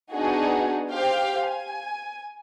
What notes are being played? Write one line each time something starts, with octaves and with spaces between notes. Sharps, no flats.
B3 D4 D#4 F#4 G#4
G4 C5 F5 G5
G#5